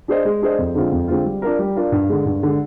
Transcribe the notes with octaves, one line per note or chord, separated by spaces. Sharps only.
D4 G#4 C5 D#5
G#3
D4 G#4 C5 D#5
F2
D3 G#3 C4 F4
F2
D3 G#3 C4 F4
G3
D4 F4 A#4
G3
D4 F4 A#4
G2
D3 G#3
G2
D3 G#3